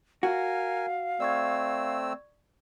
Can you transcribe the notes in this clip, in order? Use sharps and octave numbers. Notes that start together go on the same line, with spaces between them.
F#4 A#4 F5 G#5
A3 C4 D5 C#6 E6 G#6